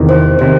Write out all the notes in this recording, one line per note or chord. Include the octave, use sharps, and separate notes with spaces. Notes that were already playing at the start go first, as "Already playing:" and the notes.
Already playing: E2 C3 D#3
C5
C3 D#3 C5